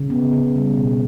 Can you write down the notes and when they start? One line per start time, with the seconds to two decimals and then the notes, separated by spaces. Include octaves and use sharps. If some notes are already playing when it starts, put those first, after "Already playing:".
Already playing: C#3
0.10 B3
0.33 C#3
0.56 G3
0.78 B2